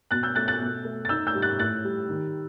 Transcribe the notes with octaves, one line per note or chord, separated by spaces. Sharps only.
B2 F#6 A6
E6 G6
A3 F#6 A6
F#6 A6
B2
A3
A6
D#4 E6 G6
E6 G6
G3
F#6 A6
A2 F#6 A6
G3
D#3